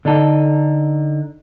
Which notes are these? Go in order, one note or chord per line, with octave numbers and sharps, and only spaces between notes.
D3 D4 D#4 A4